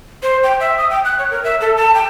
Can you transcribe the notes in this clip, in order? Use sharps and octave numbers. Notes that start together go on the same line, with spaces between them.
C5
G5
E5
D#6
G5
F#6
C#5
A#4
E5
A4
A5
G5